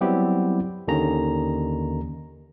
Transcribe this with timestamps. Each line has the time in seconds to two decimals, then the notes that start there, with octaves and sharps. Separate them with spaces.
0.01 F#3 G3 B3 C4 E4 G4
0.88 D#2 D3 D#3 C#4 A#5